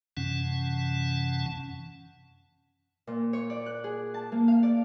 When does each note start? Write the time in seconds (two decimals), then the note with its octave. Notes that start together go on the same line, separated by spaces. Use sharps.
0.17 F#2 C3 E3 C#4 F#5 A5
3.07 A#2
3.33 C#5
3.50 D5
3.66 F#6
3.84 G#4
4.14 A5
4.32 A#3
4.48 F5
4.63 D5